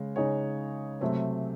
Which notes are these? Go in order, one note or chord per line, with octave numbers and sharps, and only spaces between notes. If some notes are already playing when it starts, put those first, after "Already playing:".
Already playing: C#3 G#3
C#3 G#3 D#4 G#4 C#5
C3 F#3 A3 C4